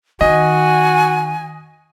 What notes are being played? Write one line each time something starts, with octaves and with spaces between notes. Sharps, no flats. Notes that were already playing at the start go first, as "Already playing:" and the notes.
D#3 F#4 D#5 G#5